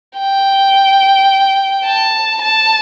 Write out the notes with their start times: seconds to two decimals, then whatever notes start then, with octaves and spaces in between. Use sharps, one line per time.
0.18 G5
1.86 A5
2.41 A5